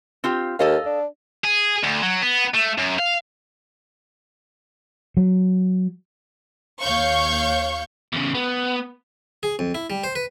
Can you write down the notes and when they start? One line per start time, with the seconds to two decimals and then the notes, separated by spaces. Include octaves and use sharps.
0.24 C4 F4 G4
0.59 D#2 A4 D#5 F5
0.85 D4
1.45 G#4
1.83 D2
2.02 F#3
2.22 B3
2.54 A3
2.78 F#2
2.99 F5
5.17 F#3
6.81 D#2 C#5 F5 C#6 G6
8.13 E2 C#3
8.35 B3
9.43 G#4
9.59 F2
9.75 E4
9.90 G3
10.04 C5
10.15 B4